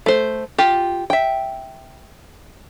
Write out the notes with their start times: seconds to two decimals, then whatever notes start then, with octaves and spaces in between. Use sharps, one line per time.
0.06 A3 C5
0.58 F4 G4
1.10 E5 G5